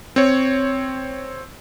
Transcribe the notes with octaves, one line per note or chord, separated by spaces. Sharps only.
C4 C#5